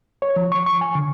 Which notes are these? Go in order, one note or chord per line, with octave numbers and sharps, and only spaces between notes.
C#5
F3
C#6
C#6
G#5
D3